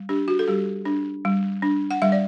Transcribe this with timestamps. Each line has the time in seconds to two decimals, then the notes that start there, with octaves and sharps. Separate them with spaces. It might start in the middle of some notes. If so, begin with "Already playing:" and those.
Already playing: G3
0.09 D4 G4
0.28 F#4
0.39 A4
0.48 G3 G4
0.85 D4
1.25 G3
1.62 D4
1.91 F#5
2.02 G3 E5
2.12 D5